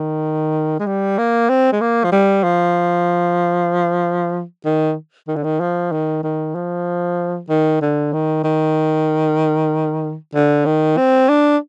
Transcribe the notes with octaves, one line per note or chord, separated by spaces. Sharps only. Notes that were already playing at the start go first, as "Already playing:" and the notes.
Already playing: D#3
G#3
G3
A#3
C4
G#3
A#3
F3
G3
F3
D#3
D#3
D3
D#3
F3
D#3
D#3
F3
D#3
D3
D#3
D#3
D3
D#3
C4
D4